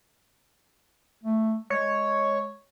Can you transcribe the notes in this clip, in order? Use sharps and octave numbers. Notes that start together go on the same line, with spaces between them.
A3
G#3 C#5